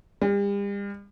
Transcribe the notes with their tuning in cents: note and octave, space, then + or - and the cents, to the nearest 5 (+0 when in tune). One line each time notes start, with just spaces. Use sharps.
G3 +40